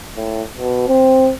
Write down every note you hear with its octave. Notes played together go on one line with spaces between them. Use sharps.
A2
B2
C4